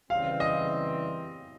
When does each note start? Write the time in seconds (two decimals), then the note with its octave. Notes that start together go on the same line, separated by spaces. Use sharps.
0.10 C#3 E3 G3 C4 F5
0.40 D#5